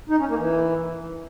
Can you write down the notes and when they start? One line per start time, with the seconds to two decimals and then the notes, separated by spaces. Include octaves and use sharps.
0.09 D#4
0.19 C#4
0.29 A#3
0.38 E3